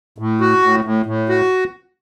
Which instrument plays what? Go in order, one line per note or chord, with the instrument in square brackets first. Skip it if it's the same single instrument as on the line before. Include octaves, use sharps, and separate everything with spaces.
[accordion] A2
F#4
A2
A2
A2
F#4